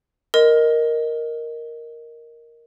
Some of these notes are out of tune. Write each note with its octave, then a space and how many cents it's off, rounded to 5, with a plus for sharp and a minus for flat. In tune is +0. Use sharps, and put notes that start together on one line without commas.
A#4 +0 D#5 +0